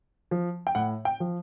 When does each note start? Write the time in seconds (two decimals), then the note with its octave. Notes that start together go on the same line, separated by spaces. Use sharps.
0.31 F3
0.67 G5
0.75 A2 F#5
1.05 G5
1.20 F3